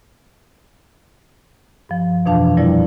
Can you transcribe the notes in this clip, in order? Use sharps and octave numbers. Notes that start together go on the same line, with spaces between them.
G2 F3
F2 B2 E3 D4 F5 A5
F2 A#2 F3 G3 E4 D5